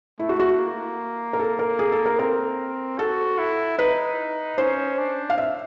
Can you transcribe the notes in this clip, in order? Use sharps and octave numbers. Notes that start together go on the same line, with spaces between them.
A3 E4
F#4
F#4
A#3
A#4
A4
A#4
G#4
A4
A#4
C4 A#4
F#4 A4
E4
D#4 B4
C#4 C5
D4
F5
E5